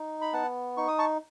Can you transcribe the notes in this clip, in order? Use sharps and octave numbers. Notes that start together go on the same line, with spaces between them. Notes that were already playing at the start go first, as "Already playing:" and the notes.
Already playing: D#4
B5
B3 F#5 A5
D#4 C#6
D#6
A5 C#6